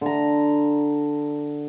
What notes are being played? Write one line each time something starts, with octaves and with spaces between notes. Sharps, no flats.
D3 A#5